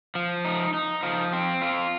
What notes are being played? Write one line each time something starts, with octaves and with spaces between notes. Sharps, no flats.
F3
D#4
D#4
F3
C4
F4